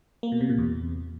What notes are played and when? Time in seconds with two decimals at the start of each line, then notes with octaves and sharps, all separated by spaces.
0.23 A#3
0.32 B2
0.41 C3
0.49 A#2
0.58 E2